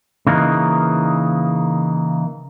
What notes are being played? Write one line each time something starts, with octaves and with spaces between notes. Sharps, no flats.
C#3 E3 A#3 D#4 A#4